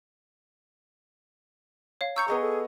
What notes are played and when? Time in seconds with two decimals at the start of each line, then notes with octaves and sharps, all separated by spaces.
2.01 C#5 F5
2.16 A#5 C#6 E6 G6 C#7
2.28 B3 G#4 D#5 C#6
2.41 A4